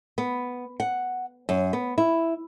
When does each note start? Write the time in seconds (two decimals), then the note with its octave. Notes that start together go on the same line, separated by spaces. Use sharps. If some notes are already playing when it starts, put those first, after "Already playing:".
0.18 B3
0.80 F#5
1.49 F#2
1.73 B3
1.98 E4